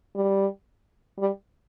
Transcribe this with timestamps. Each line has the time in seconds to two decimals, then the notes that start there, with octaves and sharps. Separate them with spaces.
0.15 G3
1.18 G3